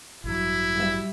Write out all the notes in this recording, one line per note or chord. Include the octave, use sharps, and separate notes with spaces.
A1 G2 F#3 E4
G3 E5